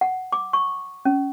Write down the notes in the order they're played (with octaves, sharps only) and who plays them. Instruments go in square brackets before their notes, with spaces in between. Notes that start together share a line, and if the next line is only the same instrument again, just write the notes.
[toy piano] F#5
D6
C#6
C#4